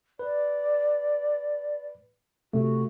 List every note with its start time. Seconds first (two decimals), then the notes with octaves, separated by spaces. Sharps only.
0.19 B4 D5
2.53 C3 A3 F#4